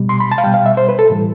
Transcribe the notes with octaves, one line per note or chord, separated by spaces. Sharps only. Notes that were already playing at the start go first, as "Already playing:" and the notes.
Already playing: B2 G3
C6
B5
A5
F5
B2 G3 G5
F5
E5
C5
B4
A4
A2 E3 G3